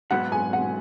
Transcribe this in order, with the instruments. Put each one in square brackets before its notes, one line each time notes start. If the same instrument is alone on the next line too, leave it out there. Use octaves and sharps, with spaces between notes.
[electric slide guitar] G#2 F#3 B3 F#4 [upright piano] F#5
[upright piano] G#5
F#5